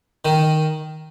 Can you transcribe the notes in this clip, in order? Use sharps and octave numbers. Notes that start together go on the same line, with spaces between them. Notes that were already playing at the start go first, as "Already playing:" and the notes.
D#3